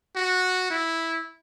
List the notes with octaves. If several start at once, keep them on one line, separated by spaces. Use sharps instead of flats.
F#4
E4